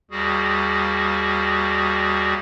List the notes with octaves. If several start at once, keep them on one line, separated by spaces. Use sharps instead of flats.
D#2 G3 F#4 G#4